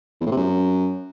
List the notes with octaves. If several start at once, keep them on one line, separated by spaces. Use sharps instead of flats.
E2
A2
C3
F#2